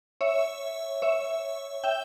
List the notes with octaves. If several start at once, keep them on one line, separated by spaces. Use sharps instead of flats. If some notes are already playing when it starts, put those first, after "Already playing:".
C#5 E5
C#5 E5
E5 G5